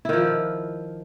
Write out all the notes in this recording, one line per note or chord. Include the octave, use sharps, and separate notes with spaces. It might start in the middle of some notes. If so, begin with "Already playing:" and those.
D#3 F3 E4